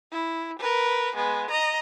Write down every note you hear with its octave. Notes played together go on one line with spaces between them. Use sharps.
E4
A#4 B4
G#3 B3
D#5 A#5